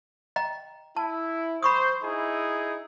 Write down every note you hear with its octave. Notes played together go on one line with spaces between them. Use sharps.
D#5 G5 A#5
E4 A5
C5 B5 C#6 D#6
D#4 E4 G#4